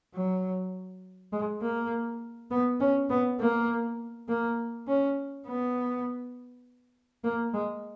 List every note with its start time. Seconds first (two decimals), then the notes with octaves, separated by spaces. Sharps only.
0.14 F#3
1.32 G#3
1.62 A#3
2.51 B3
2.80 C#4
3.10 B3
3.40 A#3
4.28 A#3
4.87 C#4
5.47 B3
7.24 A#3
7.53 G#3